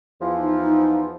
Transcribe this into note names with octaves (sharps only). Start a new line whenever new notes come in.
E2 E3 F3
D#4
D#4